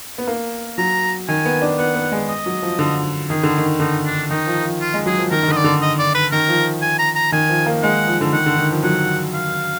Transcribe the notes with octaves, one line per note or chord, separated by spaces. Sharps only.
B3
A#3
F#3 A#5
D#3 G#5
B3
D4
B3 F#5
B3
G#3
D#5
F#3
F3
D3
D#3 G#4
D3
D#3
D3 D#4
D4
D#3 D#4
F3
F3
F4
G#3
F#3 G#4
F3
D#3 A#4
D#3
D3 D#5
D5
D3
D#5
D5
B4
D#3 A#4
F3
G#5
A#5
A#5
D#3 G#5
F3
A#3
G#3 F#5
F3
D3
D#3 F#5
D3
D#3
F3
F#3 F#5
F5